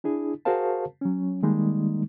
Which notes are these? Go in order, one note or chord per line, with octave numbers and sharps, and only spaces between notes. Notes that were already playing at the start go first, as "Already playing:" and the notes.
D4 E4 G#4
F#4 G#4 A#4 C5 F5 A5
F#3 C#4
D#3 G3 G#3 A#3 D#4